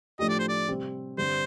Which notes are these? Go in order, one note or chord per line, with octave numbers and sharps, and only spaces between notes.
A2 F3 A3 D4 G4 D#5
D5
C5
D5
C3 G3 C4
G2 D3 G3 C4 C5